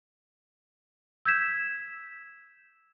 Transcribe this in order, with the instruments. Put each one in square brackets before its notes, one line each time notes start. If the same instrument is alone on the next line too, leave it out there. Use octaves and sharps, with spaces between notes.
[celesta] E6 G6 G#6 B6 E7